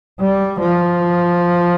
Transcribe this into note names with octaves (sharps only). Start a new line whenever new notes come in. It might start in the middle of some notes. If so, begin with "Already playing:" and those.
G3
F3